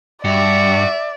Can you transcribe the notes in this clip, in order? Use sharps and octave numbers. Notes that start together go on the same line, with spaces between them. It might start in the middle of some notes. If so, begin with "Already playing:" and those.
G2 F#4 D5 E5